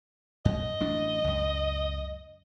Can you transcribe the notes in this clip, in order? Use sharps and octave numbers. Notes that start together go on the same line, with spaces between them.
F#2 D#5
A1 F#3 D4
C#2 F#2